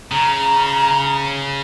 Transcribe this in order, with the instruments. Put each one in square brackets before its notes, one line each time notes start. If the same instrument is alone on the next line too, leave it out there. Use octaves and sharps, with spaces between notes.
[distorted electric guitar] C#3 [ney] A#5